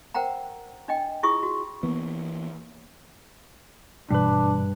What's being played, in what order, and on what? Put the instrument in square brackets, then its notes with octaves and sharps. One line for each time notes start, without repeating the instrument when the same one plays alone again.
[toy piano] A#4 C5 F#5 G5 A#5
D4 D#5 G5
E4 F4 G#4 C#6 D#6
F#4
[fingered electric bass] E3 A#3 [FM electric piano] B3
[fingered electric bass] G#1 B2 E3 [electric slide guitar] G2 B4 [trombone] D4